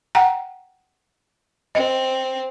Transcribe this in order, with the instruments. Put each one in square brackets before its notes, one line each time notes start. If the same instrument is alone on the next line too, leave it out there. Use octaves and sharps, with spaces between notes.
[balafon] F#5 G5 A#5
[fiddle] C4 [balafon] D#5